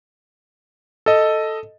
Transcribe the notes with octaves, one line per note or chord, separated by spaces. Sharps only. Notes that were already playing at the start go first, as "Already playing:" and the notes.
A4 D#5